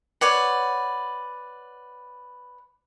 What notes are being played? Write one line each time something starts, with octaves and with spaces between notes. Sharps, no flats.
B4 C#5 D5 F#5